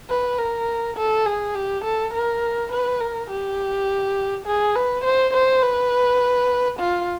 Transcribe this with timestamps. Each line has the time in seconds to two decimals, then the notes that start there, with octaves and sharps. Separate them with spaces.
0.09 B4
0.38 A#4
0.96 A4
1.26 G#4
1.55 G4
1.84 A4
2.13 A#4
2.71 B4
3.00 A#4
3.30 G4
4.46 G#4
4.76 B4
5.04 C5
5.34 C5
5.63 B4
6.79 F4